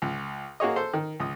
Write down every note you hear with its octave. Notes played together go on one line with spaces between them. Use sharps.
C#2
A#3 F#4 G#4 C#5 D#5
A4 C5
D#3
C#2 D#6